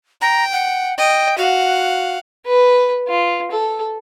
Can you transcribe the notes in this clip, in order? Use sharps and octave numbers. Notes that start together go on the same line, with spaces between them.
G5 A#5
F#5
D#5 G5
F#4 F5 F#5
B4
F4
A4